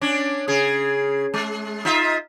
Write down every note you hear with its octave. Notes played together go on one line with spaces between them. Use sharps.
C#4 D4
C#3 G#4
G#3
D#4 F4 E5